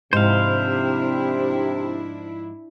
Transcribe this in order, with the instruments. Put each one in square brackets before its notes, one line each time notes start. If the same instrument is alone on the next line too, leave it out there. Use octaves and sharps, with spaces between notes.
[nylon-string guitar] G#2 F3 [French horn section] C3 [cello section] D4 E4 [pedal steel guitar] C5 F5